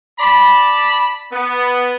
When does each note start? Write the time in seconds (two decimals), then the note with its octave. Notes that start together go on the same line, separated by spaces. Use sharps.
0.20 D5 A5 B5
1.32 B3